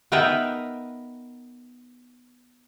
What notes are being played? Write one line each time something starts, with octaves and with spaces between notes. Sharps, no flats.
B3 D#4 A#4 B4 E5 G5